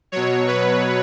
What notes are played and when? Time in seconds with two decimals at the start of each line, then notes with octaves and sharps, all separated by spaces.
0.12 B2 F#3 C#5
0.48 B4